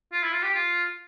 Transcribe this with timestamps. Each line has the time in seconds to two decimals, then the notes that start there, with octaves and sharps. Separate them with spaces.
0.12 F4
0.23 E4
0.33 F4
0.43 G4
0.54 F4